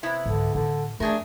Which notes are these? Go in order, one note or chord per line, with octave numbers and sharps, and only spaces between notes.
C3 B3 E4
C2 G#2 D3
A2 D3 D#4
F2 A3 D4 G#4 A#4